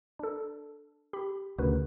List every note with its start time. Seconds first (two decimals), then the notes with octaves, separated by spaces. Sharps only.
0.19 D4 A4
1.13 G4 B5
1.58 D2 C#3 F#4 A#4 B4